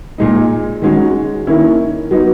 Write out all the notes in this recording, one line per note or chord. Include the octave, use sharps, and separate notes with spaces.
A#2 G#3 D#4
D#3 G#3 C#4 F#4
D#3 A#3 C#4 E4
F#3 B3 D#4